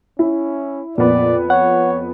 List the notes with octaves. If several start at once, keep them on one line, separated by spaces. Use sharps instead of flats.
C#4 E4
F2 A#2 B3 D5
C#5 F#5